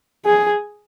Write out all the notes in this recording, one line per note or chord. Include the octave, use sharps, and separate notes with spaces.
G#4